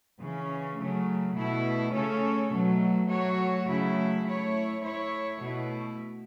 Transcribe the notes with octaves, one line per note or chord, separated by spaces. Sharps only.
C#3 E3 C#4
C#3 F#3 A3
B2 A3 E4
C#3 A3 C#4 A4 C#5
B2 F#3 A3
F#3 A3 F#4 C#5
C#3 F#3 A3 E4
A3 E4 C#5
A3 E4 C#5
B2 A3 E4